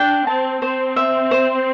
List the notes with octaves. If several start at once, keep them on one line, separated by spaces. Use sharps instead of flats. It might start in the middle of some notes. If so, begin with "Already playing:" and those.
Already playing: D4 G5
C4 A5
C4 C5
E5
C5